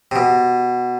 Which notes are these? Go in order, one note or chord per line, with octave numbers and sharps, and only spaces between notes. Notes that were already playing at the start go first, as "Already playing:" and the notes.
C3
B2